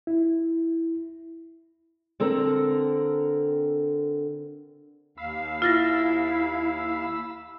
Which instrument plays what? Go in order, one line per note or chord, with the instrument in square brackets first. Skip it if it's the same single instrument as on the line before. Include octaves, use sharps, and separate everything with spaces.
[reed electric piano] E4
[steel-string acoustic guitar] D3 C4 A4 A#4
[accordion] D#2 F5 [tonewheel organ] B5 E6
[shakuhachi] E4 [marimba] F4 A6 A#6